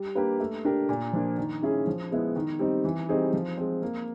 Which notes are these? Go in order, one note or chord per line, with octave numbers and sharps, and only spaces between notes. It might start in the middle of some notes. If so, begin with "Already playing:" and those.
Already playing: G3
A#3 D4 G4 B4
A3
D4 G4 A#4
A#2
F3 A#3 D4
D#3
G#3 C#4 E4 G#4
F3
G#3 B3 E4
D#3
G3 C4 D#4
E3
G3 C4 D#4 G#4
F3
G#3 C4
A#3